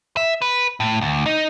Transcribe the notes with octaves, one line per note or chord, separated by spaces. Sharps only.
E5
B4
A2
D2
D#4